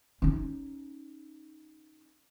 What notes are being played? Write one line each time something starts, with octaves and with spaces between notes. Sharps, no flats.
C#4 D#4